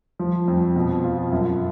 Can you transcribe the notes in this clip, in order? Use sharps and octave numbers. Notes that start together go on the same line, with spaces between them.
F3
F2
B2
F4
F#2